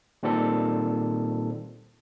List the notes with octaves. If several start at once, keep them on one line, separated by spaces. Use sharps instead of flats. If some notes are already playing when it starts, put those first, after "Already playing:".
A#2 D#3 G3 C4 A4